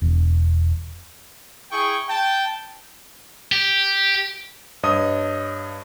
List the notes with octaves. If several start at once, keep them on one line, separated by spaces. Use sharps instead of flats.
E1
E4 G#4 G5 C#6
G5 A5
G4
G2 C#5 D#5 D#6